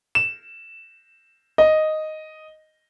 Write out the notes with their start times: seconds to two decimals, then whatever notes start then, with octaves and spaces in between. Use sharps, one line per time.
0.15 E7
1.58 D#5